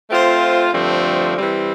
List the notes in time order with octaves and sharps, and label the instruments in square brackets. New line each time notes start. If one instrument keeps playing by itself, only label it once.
[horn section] A3 C4 F4 C5
G2 D3 F3 A3 C4
E3 G3 C4